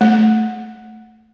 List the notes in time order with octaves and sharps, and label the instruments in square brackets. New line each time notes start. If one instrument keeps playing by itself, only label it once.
[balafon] A3